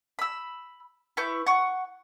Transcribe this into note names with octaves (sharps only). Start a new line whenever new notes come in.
B5 E6
E4 B4 C#6 G6
F#5 C#6